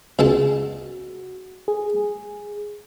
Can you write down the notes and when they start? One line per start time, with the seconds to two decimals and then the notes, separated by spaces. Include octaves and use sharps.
0.19 C#2 G#3 F#4 A5
1.68 G#4